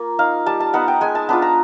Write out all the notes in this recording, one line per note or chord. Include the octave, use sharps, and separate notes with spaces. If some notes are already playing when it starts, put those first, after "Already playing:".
Already playing: A#3 F4
D#4 F5
G3 A5
A5
B3 D#4 F#5
G5
G#3 G#5
A5
B3 D4 F4 A5
A#5